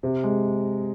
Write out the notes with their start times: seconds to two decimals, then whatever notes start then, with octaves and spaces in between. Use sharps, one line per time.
0.03 C3
0.23 G#3